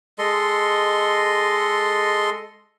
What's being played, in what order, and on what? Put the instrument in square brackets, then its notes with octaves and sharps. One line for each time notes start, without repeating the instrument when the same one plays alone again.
[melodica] G#3 A4 D#5 C6